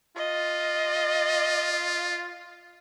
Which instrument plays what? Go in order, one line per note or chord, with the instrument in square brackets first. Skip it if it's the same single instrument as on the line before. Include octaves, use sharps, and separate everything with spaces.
[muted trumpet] F4 [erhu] D#5